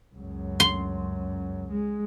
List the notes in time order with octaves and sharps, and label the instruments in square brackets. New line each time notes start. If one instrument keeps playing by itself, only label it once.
[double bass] C#2 F#2
[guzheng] C6
[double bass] G#3